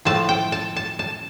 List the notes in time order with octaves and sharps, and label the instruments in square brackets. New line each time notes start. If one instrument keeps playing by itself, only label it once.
[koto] A2 F3 A3 A5
G5
A5
A5
A5